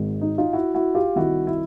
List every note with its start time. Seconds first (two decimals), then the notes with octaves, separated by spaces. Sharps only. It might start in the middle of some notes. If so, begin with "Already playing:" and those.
Already playing: G#1 G#2 D#3
0.21 D#4
0.38 D#4 F4
0.53 E4 F#4
0.74 E4 F#4
0.95 F4 G4
1.16 C2 C3 D#3 E4 F#4
1.47 E4